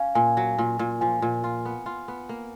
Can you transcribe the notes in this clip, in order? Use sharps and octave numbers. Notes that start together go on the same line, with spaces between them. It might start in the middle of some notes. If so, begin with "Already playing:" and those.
Already playing: C#4 F5 G#5
A#2 G#5
F#3
A#2 G#5
A#2
F3 G#5
A#2
F4
B3
F4
B3
A#3